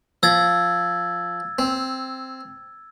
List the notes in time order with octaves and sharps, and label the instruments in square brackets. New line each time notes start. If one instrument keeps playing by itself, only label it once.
[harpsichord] F3 [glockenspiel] E6 G#6 A6
[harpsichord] C4